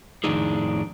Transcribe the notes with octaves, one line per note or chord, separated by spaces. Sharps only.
F2 A2 D#3 D4 D#4 G#4